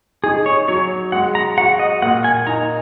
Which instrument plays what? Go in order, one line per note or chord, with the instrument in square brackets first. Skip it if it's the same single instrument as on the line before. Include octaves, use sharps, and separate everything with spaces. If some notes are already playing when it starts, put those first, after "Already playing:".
[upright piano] D#4 [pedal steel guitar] G#4
[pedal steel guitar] C#5
[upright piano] F#3 [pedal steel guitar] C#5
[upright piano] G#3 [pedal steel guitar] F#5
[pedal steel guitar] A#5
[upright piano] F#4 [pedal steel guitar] F#5
[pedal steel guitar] D#5
[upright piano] A#2 [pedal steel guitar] F#5
[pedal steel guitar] G#5
[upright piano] D#4 [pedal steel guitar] A#5